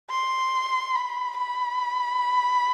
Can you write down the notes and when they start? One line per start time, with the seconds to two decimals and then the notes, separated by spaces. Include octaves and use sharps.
0.11 C6
0.95 B5
1.37 B5